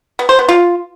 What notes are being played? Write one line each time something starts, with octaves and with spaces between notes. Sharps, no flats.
B3
C5
B3
F4